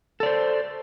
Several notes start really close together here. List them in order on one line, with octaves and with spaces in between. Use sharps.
A4 D5 C5